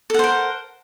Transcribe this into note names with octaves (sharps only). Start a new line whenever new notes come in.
A4 A#4 C5 F#5